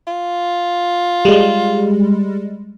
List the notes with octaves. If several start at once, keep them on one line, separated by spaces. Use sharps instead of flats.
F4
G3 G#3